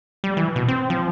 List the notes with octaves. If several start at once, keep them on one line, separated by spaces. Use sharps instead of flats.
G3
E3
B2
C4
F3